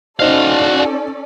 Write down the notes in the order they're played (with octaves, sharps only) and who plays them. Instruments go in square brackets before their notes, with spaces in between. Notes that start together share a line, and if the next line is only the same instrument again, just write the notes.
[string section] C#4 A4 D5 [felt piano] D#4 C5 D#5 [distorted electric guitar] F#4 F5